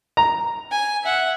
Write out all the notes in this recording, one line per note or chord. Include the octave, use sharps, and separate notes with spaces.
A#5
G#5
E5 F#5